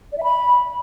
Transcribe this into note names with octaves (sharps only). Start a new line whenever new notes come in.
D5
E5
B5